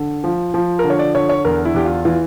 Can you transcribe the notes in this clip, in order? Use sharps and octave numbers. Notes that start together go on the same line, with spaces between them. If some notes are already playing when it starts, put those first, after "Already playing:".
Already playing: D3
F3
F3
A#4
D3
C#5
D5
D3 C#5
C#5
E2 A#4
E4
E2 G4
F4
E3 F4